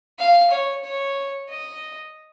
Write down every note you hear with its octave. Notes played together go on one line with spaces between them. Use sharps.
F5
C#5
C#5
D#5